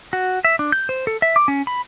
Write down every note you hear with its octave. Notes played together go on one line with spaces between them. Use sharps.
F#4
E5
D4
G6
C5
A4
E5
D6
C#4
B5